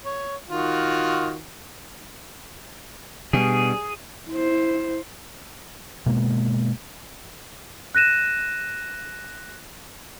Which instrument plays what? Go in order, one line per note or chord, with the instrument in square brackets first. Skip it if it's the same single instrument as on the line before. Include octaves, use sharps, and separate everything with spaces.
[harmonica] C#5
D#3 F4 F#4
[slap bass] B2 [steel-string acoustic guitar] G3 D4 [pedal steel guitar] G#4
[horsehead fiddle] E4 C5
[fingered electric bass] B2 G#3 A#3
[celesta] F#6 A#6 D#7 E7